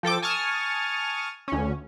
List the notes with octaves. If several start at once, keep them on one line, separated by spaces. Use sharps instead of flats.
F3 A4 G5 D6
G#5 A5 C#6 D#6 F6
D2 C#4